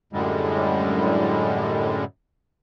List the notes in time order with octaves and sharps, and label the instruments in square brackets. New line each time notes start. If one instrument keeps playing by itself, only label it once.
[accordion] F#2 A2 D3 G3 G#3